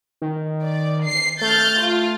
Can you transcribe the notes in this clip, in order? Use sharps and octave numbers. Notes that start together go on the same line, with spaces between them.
D#3
D5
C7
A3 F6 G6 A6
F4